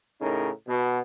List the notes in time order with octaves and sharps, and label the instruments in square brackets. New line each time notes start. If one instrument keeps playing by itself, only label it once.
[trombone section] A2 C#3 D#4 A#4
B2